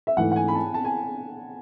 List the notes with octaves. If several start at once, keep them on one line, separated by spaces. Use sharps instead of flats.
E5
G#2 E3 A3 F#5
F#5
G#5
B5
A5
A5
G#5